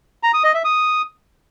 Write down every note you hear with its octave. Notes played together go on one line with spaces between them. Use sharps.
A#5
D#6
D#5
E5
D#6